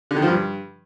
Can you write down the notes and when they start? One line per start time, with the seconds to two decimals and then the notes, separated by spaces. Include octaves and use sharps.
0.11 D3
0.16 D#3
0.22 F3
0.28 G2